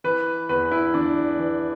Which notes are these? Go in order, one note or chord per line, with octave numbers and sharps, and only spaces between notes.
E3 B4
E2 B4
E4
E2 D4
E3